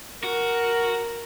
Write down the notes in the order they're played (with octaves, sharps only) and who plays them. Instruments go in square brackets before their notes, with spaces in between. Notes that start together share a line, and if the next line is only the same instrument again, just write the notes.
[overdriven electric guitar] F#4 [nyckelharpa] A#4